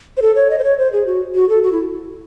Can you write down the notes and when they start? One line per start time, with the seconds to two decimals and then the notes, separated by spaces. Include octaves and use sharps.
0.17 C5
0.22 A4
0.35 C#5
0.50 D#5
0.59 C5
0.64 C#5
0.78 C5
0.93 G#4
1.06 F#4
1.35 F#4
1.49 A4
1.63 F#4
1.72 E4